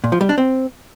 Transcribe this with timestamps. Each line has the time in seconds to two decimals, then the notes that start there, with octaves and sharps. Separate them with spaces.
0.04 A#2
0.12 F3
0.21 G3
0.29 D4
0.38 C4